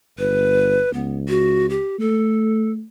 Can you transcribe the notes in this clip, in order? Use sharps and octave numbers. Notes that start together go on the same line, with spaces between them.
G1 B4
C#2 B3
F#4
G4
A3 A4